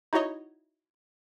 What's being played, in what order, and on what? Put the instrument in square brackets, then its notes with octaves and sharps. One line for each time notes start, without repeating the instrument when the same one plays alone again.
[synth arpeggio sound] D#4 E4 F#4 C#5 D#5